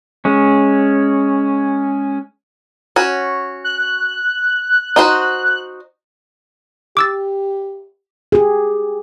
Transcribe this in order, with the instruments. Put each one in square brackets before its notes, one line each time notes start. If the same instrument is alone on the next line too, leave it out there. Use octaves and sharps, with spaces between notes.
[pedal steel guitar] G#3 C#4
[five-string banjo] C#4 F#4
[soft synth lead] F#6
[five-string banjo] D#4 F#4 C5
[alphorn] G4 [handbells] D6 E6 A6
[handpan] G4 G#4